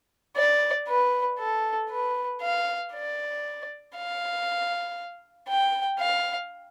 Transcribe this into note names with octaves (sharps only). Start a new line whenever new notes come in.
D5
B4
A4
B4
F5
D5
F5
G5
F5